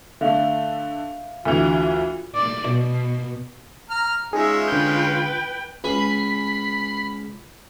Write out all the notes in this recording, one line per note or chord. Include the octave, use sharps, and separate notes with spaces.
D3 A3 E5 F5
D2 D3 E3 F4 F#4
D5
B2
A#5 F6
G#3 C#4 D#4 F4 G#4 E5
D3 B4 G5 G6
C#2 B4 G#5 B5 C7